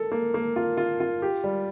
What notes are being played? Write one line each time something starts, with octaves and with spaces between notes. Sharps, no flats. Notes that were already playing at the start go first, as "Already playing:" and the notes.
Already playing: A#3 A4
A#3
A#3
F4
F4
F4
G4
G3